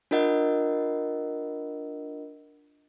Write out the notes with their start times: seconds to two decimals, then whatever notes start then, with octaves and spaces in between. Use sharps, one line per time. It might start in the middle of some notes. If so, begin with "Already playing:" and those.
0.11 D4 F4 A#4 D#5 F#5